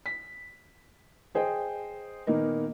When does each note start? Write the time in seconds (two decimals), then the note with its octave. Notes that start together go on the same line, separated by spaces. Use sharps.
0.06 B6
1.35 G#4 C5 D#5 G5
2.27 A#2 D#3 A#3 B3 D#4 A#4